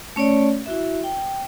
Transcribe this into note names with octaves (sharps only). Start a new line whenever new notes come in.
A3 C#4 C#5 D5
E4 F#4 E5
G5